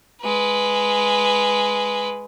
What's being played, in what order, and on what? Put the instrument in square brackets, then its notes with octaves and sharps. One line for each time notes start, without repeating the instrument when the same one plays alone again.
[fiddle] G#3 B4